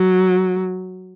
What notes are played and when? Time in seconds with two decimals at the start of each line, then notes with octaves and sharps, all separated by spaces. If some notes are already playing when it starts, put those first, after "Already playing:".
Already playing: F#3